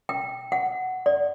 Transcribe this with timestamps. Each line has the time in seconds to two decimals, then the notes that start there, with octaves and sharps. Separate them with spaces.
0.09 G5
0.52 F#5
1.06 D5